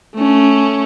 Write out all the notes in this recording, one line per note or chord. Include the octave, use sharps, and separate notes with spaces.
A3 C#4